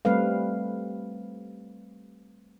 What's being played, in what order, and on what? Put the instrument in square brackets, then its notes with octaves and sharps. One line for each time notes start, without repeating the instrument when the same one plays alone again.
[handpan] G3 A3 C4 B4 F5